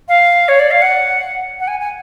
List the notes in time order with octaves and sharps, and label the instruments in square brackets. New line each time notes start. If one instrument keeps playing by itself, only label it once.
[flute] F5
C#5
D5
F5
F#5
F#5
G#5
G#5